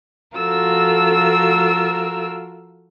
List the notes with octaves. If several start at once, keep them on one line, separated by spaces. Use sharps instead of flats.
F3 F4 F#4 A4 A#4 E6